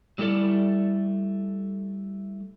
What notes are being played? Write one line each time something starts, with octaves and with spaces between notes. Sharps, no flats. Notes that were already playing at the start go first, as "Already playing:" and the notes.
F#3 G3 A3 E4 A4 D5